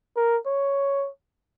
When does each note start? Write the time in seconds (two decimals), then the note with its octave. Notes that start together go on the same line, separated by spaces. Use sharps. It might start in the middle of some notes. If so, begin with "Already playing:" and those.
0.17 A#4
0.47 C#5